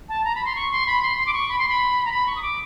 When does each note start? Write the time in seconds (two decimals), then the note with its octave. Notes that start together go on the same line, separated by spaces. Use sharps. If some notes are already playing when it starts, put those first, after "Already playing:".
0.09 A5
0.24 A#5
0.35 B5
0.45 C6
0.56 C#6
0.71 C6
0.87 B5
1.02 C6
1.18 C6
1.26 D6
1.34 C#6
1.49 B5
1.59 C6
1.69 B5
2.05 A#5
2.11 B5
2.27 C#6
2.36 D#6
2.42 D6